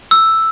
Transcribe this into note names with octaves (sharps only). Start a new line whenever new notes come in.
E6